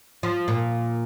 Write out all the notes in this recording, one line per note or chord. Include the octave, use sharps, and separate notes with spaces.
F3
A#2